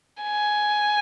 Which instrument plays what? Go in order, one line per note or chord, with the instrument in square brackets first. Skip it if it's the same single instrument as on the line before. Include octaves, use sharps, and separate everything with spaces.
[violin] G#5